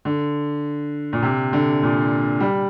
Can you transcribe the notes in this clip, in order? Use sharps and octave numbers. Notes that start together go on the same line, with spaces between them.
D3
A#2
C3
D3
A#2
G3